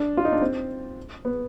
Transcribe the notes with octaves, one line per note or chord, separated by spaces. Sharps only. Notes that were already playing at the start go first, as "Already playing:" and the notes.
Already playing: D4
F4
D#4
D4
C4
B3